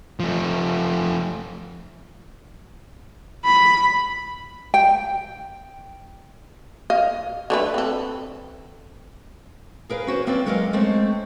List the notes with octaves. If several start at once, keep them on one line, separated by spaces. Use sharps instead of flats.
F3 A3
B5
G5
D#5 F5
D3 A3 B4
C4 A4
G#4 A#4 B4 F5
C#4 F#4 C5
A#3 C4 C#4 B4 D5
F#3 G#3 C#4 A#4 D#5 F5
G#3 A3 C4 C#4